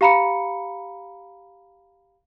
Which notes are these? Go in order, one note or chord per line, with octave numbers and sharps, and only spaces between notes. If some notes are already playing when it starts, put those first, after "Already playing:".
G4 F5 A#5 B5 C#7